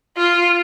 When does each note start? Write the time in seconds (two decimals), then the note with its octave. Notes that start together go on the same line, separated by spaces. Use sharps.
0.17 F4